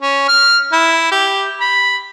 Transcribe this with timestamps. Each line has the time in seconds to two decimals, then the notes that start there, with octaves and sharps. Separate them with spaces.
0.01 C#4
0.28 F6
0.72 E4
1.11 G4
1.60 B5